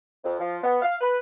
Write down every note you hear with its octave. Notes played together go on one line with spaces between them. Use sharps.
F2
F3
B3
F5
B4